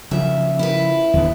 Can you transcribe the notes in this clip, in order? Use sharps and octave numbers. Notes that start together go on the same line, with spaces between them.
C#3 F3 E5
E4 B4
D#2 D3 B3